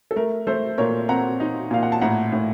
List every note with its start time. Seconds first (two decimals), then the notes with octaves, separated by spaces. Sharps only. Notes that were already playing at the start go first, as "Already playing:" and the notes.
0.11 A4
0.16 A3 A#4
0.47 A3 A4 C5
0.78 A#2 A#4 C#5
1.08 C4 F#5 A#5
1.40 D#4
1.71 A#2 F5
1.83 F#5
1.92 A5
2.01 A2 F#5 A#5
2.32 A2